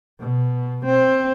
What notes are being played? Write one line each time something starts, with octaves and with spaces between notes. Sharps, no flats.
B2
C4